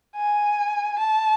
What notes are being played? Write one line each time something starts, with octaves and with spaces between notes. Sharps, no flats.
G#5
A5